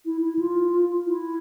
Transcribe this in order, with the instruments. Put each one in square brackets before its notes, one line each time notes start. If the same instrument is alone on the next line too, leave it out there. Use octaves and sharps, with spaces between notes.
[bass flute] E4
E4
F4
E4